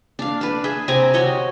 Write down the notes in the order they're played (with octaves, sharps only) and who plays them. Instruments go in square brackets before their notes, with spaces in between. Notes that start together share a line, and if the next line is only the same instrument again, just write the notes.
[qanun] D4 F5
D4 B4
G#4 E5
C3 C4 G#5 A#5
F#4 C#5 D#5